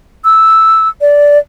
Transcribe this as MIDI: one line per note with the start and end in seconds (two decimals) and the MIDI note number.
0.24 0.89 88
1.01 1.38 74